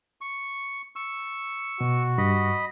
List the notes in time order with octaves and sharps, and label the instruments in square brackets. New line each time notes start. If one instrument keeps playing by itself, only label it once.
[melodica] C#6
C#6 E6
[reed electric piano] B2 [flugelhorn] F#4
[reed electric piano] G2 [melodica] D#5 B5